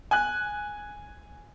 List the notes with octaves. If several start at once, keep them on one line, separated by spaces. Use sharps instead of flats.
G#5 F#6